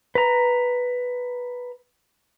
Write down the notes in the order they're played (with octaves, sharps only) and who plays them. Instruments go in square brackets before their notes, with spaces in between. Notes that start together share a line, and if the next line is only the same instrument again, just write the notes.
[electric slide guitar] B4 A#5